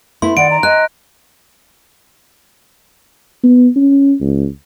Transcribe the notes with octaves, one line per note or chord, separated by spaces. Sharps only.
A3 B3 E4 C6
D#3 D5 F#5 D7
A#5
D#5 G#5 F#6
B3
C#4
C#2